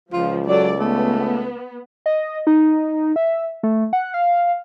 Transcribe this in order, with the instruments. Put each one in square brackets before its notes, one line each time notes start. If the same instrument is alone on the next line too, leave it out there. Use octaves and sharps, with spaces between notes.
[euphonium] C#2 [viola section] F3 [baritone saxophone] F4
[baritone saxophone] F#3 [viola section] A4 D5
[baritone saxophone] A3 [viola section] B3
[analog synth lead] D#5
D#4
E5
A3
F#5
F5